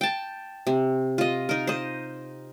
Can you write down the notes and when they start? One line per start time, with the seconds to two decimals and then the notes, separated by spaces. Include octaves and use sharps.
0.01 G5 A5
0.67 C3
1.18 F4 D#5
1.49 D#4 A#4
1.67 C5 D#5